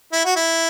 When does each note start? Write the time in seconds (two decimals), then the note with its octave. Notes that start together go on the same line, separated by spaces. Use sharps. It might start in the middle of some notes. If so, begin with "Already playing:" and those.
0.12 E4
0.25 F#4
0.36 E4